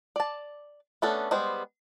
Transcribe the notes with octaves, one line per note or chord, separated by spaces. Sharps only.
D5 A5
A3 B3 C#4 D4 A4
G3 G#3 B3 C5